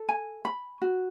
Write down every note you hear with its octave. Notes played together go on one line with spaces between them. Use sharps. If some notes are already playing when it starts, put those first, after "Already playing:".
Already playing: A4
G#5
B5
F#4